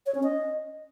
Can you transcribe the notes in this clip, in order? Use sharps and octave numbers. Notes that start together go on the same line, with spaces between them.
C#5
C#4
D#5